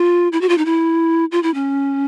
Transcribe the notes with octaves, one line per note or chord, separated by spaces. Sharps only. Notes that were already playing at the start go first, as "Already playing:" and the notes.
Already playing: F4
E4
F#4
F4
D#4
E4
F4
E4
C#4